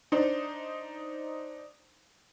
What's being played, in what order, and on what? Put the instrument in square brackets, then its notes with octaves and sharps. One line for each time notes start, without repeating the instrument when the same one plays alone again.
[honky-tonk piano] D4 D#4 C5